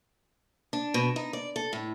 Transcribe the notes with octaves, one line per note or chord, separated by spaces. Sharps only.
D4
B2
D#4
D5
A4
A2